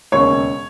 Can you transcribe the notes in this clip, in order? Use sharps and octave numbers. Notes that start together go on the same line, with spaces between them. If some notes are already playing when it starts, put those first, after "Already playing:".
E1 D#2 C#3 C#5